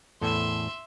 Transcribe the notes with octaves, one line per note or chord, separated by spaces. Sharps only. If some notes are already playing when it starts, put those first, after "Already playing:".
E2 A2 A4 E5 C6